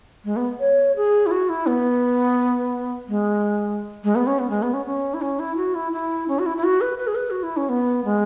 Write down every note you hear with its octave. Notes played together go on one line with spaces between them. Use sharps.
G#3
B3
C#5
G#4
E4
F#4
E4
B3
G#3
G#3
B3
C#4
B3
G#3
B3
C#4
C#4
E4
C#4
E4
F#4
E4
E4
C#4
F#4
E4
E4
F#4
B4
B4
G#4
B4
F#4
E4
C#4
B3
G#3